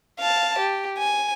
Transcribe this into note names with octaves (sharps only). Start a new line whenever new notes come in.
F5 A5
G4
G#5